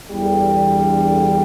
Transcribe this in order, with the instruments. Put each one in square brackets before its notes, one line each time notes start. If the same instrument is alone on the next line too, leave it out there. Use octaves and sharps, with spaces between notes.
[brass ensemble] E2 D3 G3